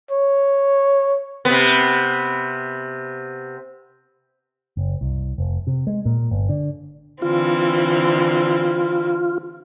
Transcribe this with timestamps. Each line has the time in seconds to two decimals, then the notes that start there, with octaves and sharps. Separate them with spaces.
0.11 C#5
1.45 C3 B3
4.77 F#1
5.01 C2
5.38 F1
5.67 C3
5.87 G#3
6.05 A#2
6.31 G1
6.49 D3
7.22 D3 E3 C4 F4